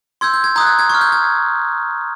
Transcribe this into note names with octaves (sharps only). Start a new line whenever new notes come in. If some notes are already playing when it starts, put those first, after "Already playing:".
C6 E6 G6 G#6
G6
G#6
A#5 D#6 F#6 G6
G#6
G#6
C#6 G#6
F6
G6
G#6